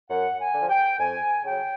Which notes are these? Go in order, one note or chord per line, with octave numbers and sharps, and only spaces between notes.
F#2 F#5
G#5
D3 F3
G5
F2 G#5
C#3 F#3 G5